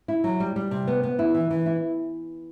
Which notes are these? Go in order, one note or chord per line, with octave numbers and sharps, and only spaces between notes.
E4
F#3
G3
G3
C3
B3
B3
E4
E3
E3
E4